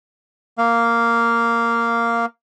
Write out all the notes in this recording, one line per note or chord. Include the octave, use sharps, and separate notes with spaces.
A#3 F5